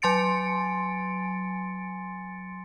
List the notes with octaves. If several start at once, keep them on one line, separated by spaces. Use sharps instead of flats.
F#3 G#5 C6 A6 C#7 D7